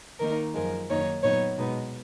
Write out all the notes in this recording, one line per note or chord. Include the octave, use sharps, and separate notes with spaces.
D#3 A#3 D#4 A#4
F#2 F3 G#3 A#4
F#2 D#3 A#3 D#4 C#5
A#2 F#3 B3 D#4 C#5
B2 G#3 B3 D#4